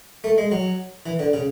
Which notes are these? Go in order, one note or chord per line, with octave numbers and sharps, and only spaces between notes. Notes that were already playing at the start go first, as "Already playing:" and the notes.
A3
G#3
F#3
E3
D3
C#3